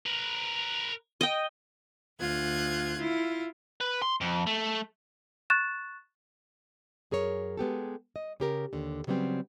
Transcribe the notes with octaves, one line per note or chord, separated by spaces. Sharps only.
A#4 B4
D#5 G5
D2 F4 F#6 G#6
E4 F4
B4
C6
F2
A3
C#6 F#6 A6 E7
F#2 G#4 A#4 C#5
G#3 B3 G4 A4
D#5
C#3 G4 A#4
D#2 D3
C#3 F#3 G3 B3 C4